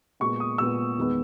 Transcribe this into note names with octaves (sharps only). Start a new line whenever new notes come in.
A#2 G#3 B3 C#6
D#6
A#2 G#3 B3 E6
E2 D#3 G#3 B3